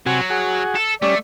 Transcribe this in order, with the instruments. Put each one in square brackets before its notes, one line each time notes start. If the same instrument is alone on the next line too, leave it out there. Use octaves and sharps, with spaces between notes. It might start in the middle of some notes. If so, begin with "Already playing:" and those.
[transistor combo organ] C3 F#4 G#5 [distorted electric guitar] F#3
[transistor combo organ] F#4 G#4
[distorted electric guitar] A4
[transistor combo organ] G3 C#4 [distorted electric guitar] A3 [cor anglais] D5